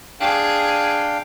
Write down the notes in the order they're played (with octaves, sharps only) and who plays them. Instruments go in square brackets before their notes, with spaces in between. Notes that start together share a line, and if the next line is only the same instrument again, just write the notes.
[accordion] D4 F5 G5 [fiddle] G#4